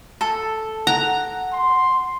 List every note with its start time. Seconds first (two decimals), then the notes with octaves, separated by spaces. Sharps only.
0.21 A4
0.87 F#5 A#5
1.53 C6